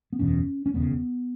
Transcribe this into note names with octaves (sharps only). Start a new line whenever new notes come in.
B3
F#1 E2 B2 C#4
C#4
E1 D#2 C#3 B3